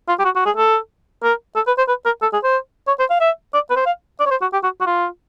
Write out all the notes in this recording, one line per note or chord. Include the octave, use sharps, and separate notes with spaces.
F4
G4
F#4
F#4
G#4
A4
A#4
A4
B4
C5
B4
A#4
A4
G#4
C5
C#5
C5
F5
E5
D5
B4
C5
F5
D5
C#5
C5
F#4
G4
F#4
F#4
F4